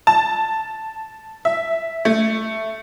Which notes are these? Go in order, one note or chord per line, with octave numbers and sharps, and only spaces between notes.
A5
E5
A3